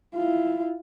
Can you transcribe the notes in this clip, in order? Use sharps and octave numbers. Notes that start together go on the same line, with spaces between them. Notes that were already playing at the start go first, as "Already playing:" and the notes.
E4 F4